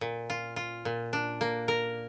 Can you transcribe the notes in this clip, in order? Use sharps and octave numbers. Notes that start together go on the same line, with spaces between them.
A#2
F4
F4
A#2
D4
A#3
A#4